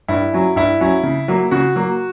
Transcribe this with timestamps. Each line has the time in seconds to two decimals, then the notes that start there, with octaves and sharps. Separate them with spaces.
0.08 G2 E4
0.33 F#3 C#4
0.56 G2 E4
0.81 F#3 C#4
1.03 C#3
1.28 F#3 A#3
1.51 C#3 F#4
1.76 F#3 A#3